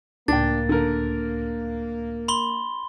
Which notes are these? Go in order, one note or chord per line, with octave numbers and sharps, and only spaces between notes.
C#2 A2 A#3 D4 G5 A6
D3 A#4
B5 C6 G7